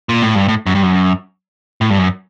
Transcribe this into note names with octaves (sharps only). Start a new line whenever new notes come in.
A#2
A2
G2
A2
F#2
G2
F#2
A2
G2
F#2